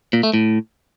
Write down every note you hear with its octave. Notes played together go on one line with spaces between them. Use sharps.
A#2
A3
A2